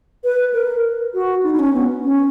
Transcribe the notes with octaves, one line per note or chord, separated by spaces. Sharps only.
B4
A#4
F#4
D#4
D#4
C#4
B3
C#4